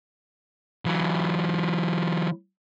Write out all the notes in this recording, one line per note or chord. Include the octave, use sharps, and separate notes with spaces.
E3 F#3